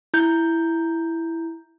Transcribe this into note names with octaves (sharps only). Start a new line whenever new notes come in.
E4 G6